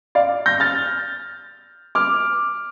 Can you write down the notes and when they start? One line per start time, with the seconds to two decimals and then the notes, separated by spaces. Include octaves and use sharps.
0.15 D5 F5
0.46 G6 A#6
0.60 F6 A6
1.95 D6 F6